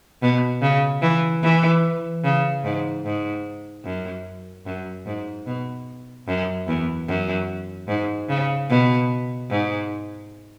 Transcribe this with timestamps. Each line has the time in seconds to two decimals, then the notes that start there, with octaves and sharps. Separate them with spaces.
0.22 B2
0.62 C#3
1.02 E3
1.42 E3
2.24 C#3
2.64 G#2
3.04 G#2
3.84 F#2
4.66 F#2
5.06 G#2
5.47 B2
6.28 F#2
6.68 E2
7.08 F#2
7.88 G#2
8.29 C#3
8.69 B2
9.50 G#2